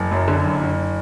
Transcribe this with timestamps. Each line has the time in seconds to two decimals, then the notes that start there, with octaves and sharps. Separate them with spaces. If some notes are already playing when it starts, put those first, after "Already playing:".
Already playing: F#1
0.11 F#2
0.28 D3
0.45 F#1
0.61 F#1